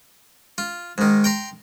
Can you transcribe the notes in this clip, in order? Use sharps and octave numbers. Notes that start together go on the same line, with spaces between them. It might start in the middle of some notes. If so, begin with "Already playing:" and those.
F4
G#2 D#3
G5 A#5 C6